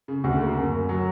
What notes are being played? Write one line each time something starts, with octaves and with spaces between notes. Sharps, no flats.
C#3
D2
A#3
F#2
F#2
F#3